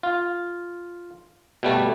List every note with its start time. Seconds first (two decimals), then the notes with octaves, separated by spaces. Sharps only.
0.03 F4
1.63 B2 G3 A3